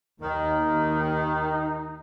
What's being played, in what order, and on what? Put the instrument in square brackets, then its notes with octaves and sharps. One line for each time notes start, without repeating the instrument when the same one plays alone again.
[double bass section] D#2 [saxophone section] D#3 [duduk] D#4